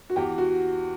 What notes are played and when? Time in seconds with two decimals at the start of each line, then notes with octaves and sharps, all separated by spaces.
0.10 F#4
0.16 E2 G4
0.38 F#4